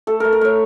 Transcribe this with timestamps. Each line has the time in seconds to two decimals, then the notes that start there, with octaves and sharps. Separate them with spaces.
0.07 A3 A4
0.20 A3 A#4
0.33 A#4
0.41 A3 C#5